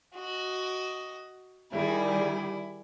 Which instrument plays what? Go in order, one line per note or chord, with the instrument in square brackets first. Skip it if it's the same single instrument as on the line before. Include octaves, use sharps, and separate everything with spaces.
[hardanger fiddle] F#4 D#5
[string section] D#3 G3 G#4 [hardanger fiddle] E4